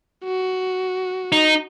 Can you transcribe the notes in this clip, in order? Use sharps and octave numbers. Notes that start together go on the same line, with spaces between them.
F#4
D#4